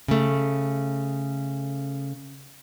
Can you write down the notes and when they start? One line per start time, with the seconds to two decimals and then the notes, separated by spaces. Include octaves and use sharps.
0.08 C#3 A3